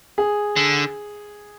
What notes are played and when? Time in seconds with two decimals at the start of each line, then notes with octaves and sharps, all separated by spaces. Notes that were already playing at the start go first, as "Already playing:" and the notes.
0.18 G#4
0.56 D3